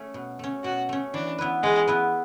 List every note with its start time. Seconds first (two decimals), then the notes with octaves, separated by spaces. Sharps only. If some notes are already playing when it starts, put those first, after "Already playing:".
Already playing: A3 C#4
0.14 B2
0.39 A3 C#4
0.64 B2 F#4
0.89 A3 C#4
1.14 E3 D4
1.38 B3 E4 B4
1.63 E3 G#3
1.87 B3 E4 B4